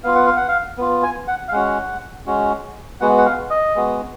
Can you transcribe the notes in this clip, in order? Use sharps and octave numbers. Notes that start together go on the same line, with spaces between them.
B3 F4 F5
F#5
F5
F#5
F5
B3 F4
G#5
F#5
F5
G#3 C#4 F#4 F#5
G#3 C#4 F#4
G#3 B3 F#4 F#5
F#5
F5
D#5
G#3 B3 F#4